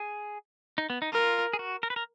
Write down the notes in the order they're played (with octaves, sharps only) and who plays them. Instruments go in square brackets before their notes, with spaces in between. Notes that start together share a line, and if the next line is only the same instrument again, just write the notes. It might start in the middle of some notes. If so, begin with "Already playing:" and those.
Already playing: [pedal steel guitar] G#4
D#4
B3
D#4
[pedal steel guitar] F4 [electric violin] A#4
[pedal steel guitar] G#4
F#4
A#4
B4
A#4